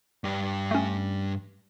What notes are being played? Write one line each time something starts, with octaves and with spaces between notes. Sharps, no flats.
G2 G4
A3 C#4